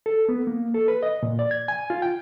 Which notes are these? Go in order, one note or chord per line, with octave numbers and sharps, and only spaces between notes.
A4
B3
A#3
A4
B4
D#5
A#2
D5
G#6
G#5
F4
G5